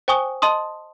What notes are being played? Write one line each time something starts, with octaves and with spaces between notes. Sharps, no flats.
C5 G5 G#5 C#6 D#6 G7
D#5 A5 C6 D#6